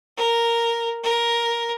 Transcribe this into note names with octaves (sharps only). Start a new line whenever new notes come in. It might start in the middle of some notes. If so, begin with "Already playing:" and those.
A#4
A#4